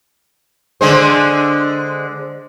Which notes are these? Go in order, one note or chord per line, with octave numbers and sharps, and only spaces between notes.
D3 G#3 C5